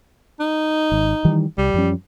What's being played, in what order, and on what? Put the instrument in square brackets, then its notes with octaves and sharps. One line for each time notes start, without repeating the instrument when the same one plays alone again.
[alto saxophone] D#4
[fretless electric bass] G#1
D#3 E3 G3
[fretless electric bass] C2 [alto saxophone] G3
[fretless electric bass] F#2 F3 C#4